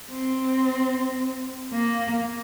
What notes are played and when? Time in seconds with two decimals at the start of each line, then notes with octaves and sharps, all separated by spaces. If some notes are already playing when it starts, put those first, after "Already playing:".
0.11 C4
1.73 A#3